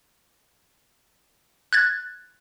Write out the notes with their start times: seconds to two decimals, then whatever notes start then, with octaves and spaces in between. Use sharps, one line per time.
1.73 F#6 G#6 A6